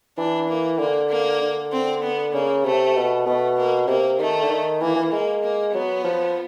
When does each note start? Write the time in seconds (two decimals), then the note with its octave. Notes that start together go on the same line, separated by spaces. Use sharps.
0.18 E3 D4
0.48 A#3
0.79 D3 A#3
1.09 A#3
1.41 D3
1.72 C4
2.03 B3
2.34 C#3 A#3
2.64 C3 A3
2.96 B2
3.26 B2 A3
3.57 A#3
3.88 C3 A#3
4.20 D#3 A3
4.43 D3
4.50 D#3
4.81 E3 A#3
4.96 E3
5.12 G#3 A#3
5.43 A#3
5.74 F#3 B3
6.04 F3